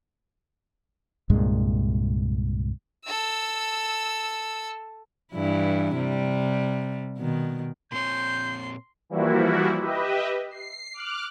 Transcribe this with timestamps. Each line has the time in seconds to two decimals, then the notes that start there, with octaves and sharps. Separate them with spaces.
1.30 C2 G2 A#2 G#3
3.06 A4 E6
5.32 G2 E3 E4
5.96 C3 G3
7.18 B2 D#3
7.92 A#2 C4 C#5 C6 G6
9.10 E3 F3 G3 A#3 E4 F#4
9.80 G4 B4 D#5 E5
10.51 C7
10.94 D6 F6 F#6